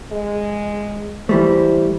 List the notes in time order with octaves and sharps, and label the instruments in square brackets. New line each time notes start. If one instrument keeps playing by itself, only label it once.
[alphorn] G#3
[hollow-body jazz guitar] E3 G3 A3 [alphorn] C5